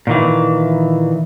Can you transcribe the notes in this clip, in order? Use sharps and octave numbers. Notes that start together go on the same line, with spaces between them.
A#2 D#3 E3